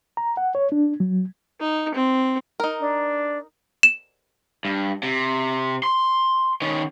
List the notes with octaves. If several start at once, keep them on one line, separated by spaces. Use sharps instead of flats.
A#5
F#5
C#5
D4
F#3
D#4
C4
D#4 A#4
D4
E7
G2
C3
C6
D#3 C#4